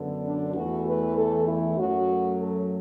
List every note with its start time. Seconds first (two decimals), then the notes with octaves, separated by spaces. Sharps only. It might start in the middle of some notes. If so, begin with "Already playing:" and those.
Already playing: F#2 D3 B3
0.24 D4
0.55 E2 E3 A3 F#4
0.86 B4
1.16 A4
1.46 E4
1.77 F#2 F#3 A3 F#4
2.39 A4